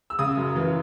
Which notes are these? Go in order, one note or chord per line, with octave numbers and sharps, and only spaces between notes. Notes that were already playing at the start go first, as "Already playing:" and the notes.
E6
C#3 D#6
F#2
E3